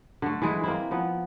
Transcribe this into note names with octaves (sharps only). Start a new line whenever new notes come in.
D3 A3
E3 G#3 E4
A#3 C4 E4
F3 B3